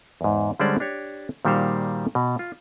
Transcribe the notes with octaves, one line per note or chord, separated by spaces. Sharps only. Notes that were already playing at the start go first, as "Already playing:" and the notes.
E2 G#2
D3 G3 G#3 C#4 C5 D5
D4 G4 C#5
A#2 D#3 G3 F#4 C5 F5
B2
F4